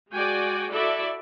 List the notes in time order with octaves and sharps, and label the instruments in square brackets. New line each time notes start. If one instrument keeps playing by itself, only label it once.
[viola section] G#3 F#4 D5 G5 G#5
E4 F#4 A4 D5 E5